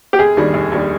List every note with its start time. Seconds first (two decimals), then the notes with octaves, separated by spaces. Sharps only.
0.13 G4
0.19 F1 G#4
0.37 D#2 D#3 G3 D4
0.54 F1
0.72 D#2 D#3 G3 D4